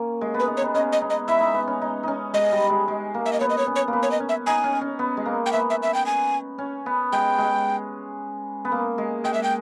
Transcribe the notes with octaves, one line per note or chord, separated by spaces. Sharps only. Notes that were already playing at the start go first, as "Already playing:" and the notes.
Already playing: A#3 C#4
G#3
B3
B4
D#4
C#5
B3
C#4 D#5
D#5
D#4
D#5
E4 E5
D#4
B3
C#4
D#4
C#4 D#4
G#3 D#5
G3
G#3
G#3
A#3
E5
D#5
B3 C#5
D#5
C#5
C#4
C#5
A#3
B3
C#5
D#5
C#4
E5
D#4 G#5
C#4
C#4
B3
G#3
A#3
G5
B3 E5
E5
E5
G5
G#5
C#4
B3
G#3 G5
G#3
B3
A#3
G#3
G#3 G5
E5
G5